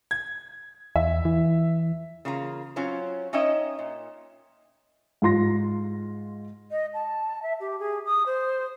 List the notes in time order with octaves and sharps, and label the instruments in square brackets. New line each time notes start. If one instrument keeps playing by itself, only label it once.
[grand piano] G#6
[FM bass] E2 [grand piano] E5
[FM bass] E3
[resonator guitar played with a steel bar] C#3 A#3 F4 A#5
F#3 C4 C#4 F4
C#4 D#4 C#5 D#5 E5 G5
A#2
[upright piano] G#2 F4 C6 A#6
[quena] D#5
A5
E5
G4
G#4
D#6
C5